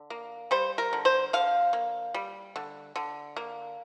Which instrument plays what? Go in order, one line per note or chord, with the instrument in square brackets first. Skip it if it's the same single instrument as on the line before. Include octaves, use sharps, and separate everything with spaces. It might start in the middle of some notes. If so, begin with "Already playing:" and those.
Already playing: [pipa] D3
A#3
G3 C5
A#4
D3
C5
D3 F5
A#3
G3
D3
D3
A#3